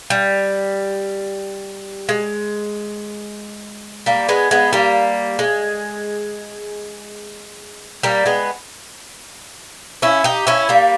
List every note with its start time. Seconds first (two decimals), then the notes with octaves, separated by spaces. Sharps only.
0.10 G3
2.09 G#3
4.06 G3 A#3
4.28 G#3 B3
4.51 G#3 B3
4.73 G3 A#3
5.39 G#3
8.03 G3 A#3
8.26 G#3 B3
10.02 C#4 E4
10.24 D#4 G4
10.47 C#4 E4
10.69 G3 A#3